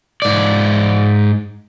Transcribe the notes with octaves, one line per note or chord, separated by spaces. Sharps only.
G#2 D5